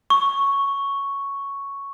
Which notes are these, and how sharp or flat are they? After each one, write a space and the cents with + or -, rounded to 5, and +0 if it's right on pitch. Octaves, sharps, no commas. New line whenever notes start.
C#6 +0